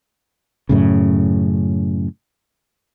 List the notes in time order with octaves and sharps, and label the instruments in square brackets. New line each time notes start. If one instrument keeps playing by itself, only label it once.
[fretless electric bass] F#2 A2 C#3